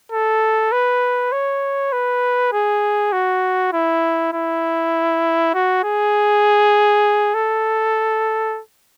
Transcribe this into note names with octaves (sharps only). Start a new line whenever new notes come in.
A4
B4
C#5
B4
G#4
F#4
E4
E4
F#4
G#4
A4